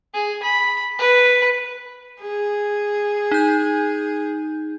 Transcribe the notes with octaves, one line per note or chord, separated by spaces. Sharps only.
G#4
B5
B4
G#4
D#4 G6